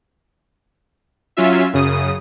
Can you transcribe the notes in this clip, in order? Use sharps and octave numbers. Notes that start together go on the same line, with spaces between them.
F#3 C#4 F4 E5
F#2 C#3 D#6 D#7